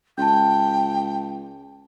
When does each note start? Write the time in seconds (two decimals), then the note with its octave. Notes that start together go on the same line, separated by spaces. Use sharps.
0.18 C#2 G5 A5 C6 G6